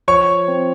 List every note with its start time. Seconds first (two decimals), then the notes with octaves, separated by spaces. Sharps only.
0.08 F3 C#5 C#6
0.48 C4